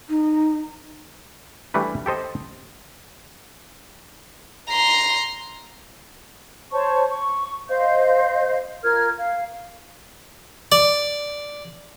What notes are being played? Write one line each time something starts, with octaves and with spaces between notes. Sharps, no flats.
D#4
E3 G3 A3 D4 B4
G4 A4 C5 D#5
A#5 C6
C5 C#5 A5 C#6
C#6
C5 D#5 F5 G6
F4 A#4 F6 G#6
F5
D5